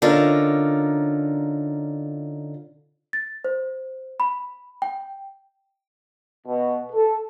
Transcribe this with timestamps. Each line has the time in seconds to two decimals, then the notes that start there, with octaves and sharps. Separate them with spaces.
0.02 D3 C#4 D#4 F4 A#4
3.13 A6
3.44 C5
4.20 B5
4.82 G5
6.46 B2
6.92 A4